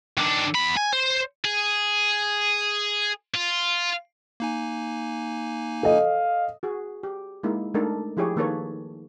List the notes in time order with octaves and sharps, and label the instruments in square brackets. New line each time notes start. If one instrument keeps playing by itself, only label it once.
[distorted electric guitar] D#3 D4
E2 B5
G#5
C5
G#4
F4
[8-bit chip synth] A#3 D#4 G#5
[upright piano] A4 D#5 [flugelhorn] F5
[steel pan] F#4 G#4
G4
G#3 A#3 D#4 E4
G#3 A3 D4 D#4 A4 A#4
F3 E4 G4 G#4 C#5
D#3 A#3 D#4 A4 B4 C#5